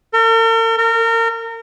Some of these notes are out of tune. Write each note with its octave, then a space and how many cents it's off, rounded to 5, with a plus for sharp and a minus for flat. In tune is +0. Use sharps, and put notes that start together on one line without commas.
A#4 -45
A#4 -30